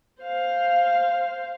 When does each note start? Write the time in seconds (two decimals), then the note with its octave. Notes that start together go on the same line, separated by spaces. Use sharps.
0.22 C5 F5